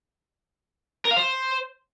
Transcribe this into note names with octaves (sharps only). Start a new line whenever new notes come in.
A#4
F5
C5